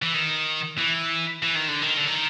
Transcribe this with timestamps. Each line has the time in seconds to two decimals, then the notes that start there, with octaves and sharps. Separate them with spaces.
0.02 E3
0.14 D#3
0.78 E3
1.42 E3
1.55 D#3
1.68 D3
1.82 D#3
1.97 D3
2.07 D#3